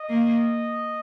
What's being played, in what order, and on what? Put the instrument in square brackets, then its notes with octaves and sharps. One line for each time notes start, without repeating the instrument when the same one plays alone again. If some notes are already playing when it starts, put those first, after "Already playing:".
Already playing: [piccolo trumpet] D#5
[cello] A#3